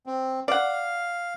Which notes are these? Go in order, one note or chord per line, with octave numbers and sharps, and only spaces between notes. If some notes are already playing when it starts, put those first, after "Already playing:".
C4
D5 F5 F#5